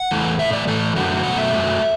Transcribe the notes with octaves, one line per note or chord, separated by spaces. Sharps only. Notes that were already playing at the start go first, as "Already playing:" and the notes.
Already playing: F#5
E2 E3 A3
A2 A3 E5
D5
A2 E3 A3 A4
F#2 D3 A3 F#4
B2 F#3 A3 F#5
E5
F#2 F#3 A3